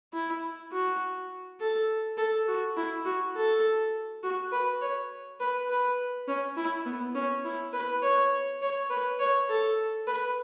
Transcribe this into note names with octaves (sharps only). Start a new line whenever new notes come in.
E4
F#4
A4
A4
F#4
E4
F#4
A4
F#4
B4
C#5
B4
B4
C#4
E4
B3
C#4
E4
B4
C#5
C#5
B4
C#5
A4
B4